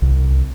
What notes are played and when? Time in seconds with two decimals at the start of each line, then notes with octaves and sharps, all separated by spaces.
0.02 C2